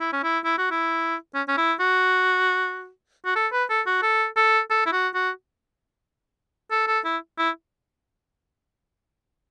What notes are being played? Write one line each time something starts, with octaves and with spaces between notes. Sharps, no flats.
E4
C#4
E4
E4
F#4
E4
C#4
C#4
E4
F#4
F#4
A4
B4
A4
F#4
A4
A4
A4
E4
F#4
F#4
A4
A4
E4
E4